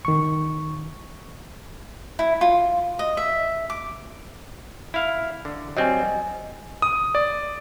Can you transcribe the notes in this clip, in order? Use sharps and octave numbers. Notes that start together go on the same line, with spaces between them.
D#3 C#6
E4
F4
D#5
E5
D6
E4 F5
D3
F#3 G3 C4 D#5 G#5
D#6
D5